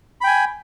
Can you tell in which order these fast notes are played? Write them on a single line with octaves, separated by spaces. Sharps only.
B5 G5 G#5